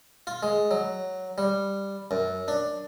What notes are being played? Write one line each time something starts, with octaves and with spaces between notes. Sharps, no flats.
F4
G#3
F#3
G3
F#2
D4